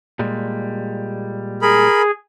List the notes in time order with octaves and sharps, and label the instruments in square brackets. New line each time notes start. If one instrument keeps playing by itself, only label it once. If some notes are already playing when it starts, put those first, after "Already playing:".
[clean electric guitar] A#2 G3 G#3
[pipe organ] G#4 [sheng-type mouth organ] A#4 B5